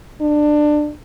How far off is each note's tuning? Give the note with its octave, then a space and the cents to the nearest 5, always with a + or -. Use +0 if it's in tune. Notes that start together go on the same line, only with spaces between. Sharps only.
D4 +20